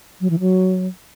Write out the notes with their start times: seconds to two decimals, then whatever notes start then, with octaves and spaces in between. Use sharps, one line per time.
0.21 F#3
0.30 E3
0.40 F#3